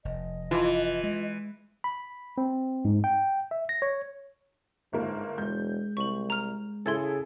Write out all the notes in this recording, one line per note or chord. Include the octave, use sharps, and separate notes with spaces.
F1 D#5
E3 F4 A5
G#3
B5
C4
G#2
G5
E5
A#6
C#5
G1 G#2 A#3
E1 G#3 G6
C2 C#6 F#7
A#5 F6
C#3 E4 G#4 A4 C6 G#6 A6